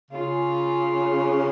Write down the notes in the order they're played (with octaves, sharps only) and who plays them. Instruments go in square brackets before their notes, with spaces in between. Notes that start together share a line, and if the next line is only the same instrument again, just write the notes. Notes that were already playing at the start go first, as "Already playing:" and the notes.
[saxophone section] C#3 [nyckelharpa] F4